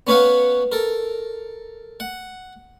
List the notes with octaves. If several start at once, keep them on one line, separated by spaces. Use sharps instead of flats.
B3 C#4 B4 C#5 F5 F#5
A4 A#4
F#5